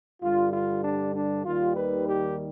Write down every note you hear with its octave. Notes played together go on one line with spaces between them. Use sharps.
G2 D3 G3 F4
F4
D4
D4
D#2 D#3 G3 F4
B4
G4